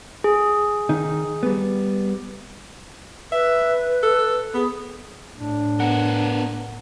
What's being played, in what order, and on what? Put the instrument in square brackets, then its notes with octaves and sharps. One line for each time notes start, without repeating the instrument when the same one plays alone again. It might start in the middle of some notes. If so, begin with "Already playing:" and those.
[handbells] G#4
[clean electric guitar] D#3 D#4
G3 B3
[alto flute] B4 [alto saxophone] E5
[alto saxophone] A4
[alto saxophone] B3 [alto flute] G#4
[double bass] A2 [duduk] D4
[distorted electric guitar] B3 A#4 [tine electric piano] F#5